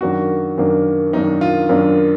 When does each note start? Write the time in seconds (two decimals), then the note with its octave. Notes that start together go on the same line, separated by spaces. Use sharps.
0.01 F#2 D#3 A#3 D4 F#4
0.58 F#2 D#3 A#3 D4
1.13 F#2 D#3 A#3 D4 D#4
1.41 F4
1.69 F#2 D#3 A#3 D4